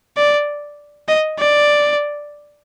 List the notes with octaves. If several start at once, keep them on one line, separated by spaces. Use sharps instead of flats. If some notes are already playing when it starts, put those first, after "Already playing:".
D5
D#5
D5